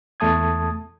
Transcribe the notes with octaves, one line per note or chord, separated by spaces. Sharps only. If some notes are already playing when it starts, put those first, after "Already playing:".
E2 A3 A5 D#6 G#6